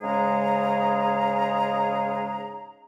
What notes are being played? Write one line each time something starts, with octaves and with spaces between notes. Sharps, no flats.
G#2 C#3 G#3 G#4 A#5